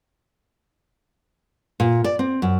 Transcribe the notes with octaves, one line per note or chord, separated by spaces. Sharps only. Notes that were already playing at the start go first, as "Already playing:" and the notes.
A#2
D5
C4
F#2